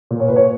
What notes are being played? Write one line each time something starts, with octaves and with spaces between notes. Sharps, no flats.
A#2
C#5
A#2 B4
C#5